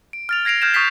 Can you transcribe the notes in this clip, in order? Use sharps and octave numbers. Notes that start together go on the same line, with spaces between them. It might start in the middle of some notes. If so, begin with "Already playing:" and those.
D7
F6 A6 F7
G#6 A#6 C7 D7 F7
F6 G6 G#6 E7
C#6 D#6 G6 A6 B6 C7